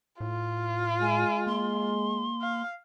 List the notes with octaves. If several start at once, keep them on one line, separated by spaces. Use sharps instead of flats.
A2 F4
G#3 G#5
A#3 C6
F5